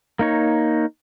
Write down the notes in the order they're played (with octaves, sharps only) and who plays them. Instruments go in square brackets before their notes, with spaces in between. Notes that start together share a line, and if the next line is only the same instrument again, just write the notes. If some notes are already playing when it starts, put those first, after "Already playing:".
[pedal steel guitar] A#3 D#4 C#5